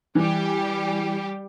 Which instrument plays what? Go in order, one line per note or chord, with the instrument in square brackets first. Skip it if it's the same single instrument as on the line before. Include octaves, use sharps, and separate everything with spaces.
[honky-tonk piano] E3 [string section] G3 G4